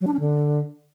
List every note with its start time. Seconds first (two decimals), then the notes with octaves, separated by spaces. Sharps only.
0.01 F#3
0.07 D4
0.13 C#4
0.20 D3